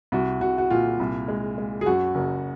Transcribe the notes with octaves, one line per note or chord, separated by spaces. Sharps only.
C2 F#4
C2 F#4
F#4
A#2 F4
C2
G#3
G#3
G#4
F#2 F#4
F#1